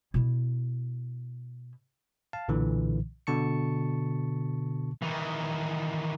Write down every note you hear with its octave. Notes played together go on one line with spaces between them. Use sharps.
B2 E4
F5 A5
B1 A#2 D3 E3
B2 D3 A5 C#6 C#7
D#3 E3